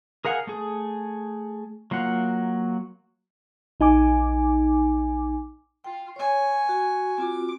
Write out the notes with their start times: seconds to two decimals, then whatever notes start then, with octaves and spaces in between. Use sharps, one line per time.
0.25 G#4 A#4 F5 F#5 G#5
0.47 A3 G#4
1.91 F#3 A#3 F4 F#5
3.80 A#1 D#4 G#5 D6
5.84 F4 G5
6.16 C#5 G#5 C#6
6.69 F#4
7.18 C4 F4 F#4 D6